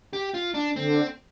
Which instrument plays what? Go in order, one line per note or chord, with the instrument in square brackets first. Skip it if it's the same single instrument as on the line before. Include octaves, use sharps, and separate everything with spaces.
[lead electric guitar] G4
F4
D4
[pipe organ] D3 [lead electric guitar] C4